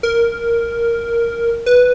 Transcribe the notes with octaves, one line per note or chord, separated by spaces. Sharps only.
A#4
B4